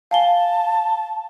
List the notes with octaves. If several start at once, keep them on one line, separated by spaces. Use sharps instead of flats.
F5 G#5 A5 G7